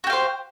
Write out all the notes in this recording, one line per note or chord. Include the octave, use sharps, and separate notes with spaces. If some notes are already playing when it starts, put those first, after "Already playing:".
F#4 G4 C5 F5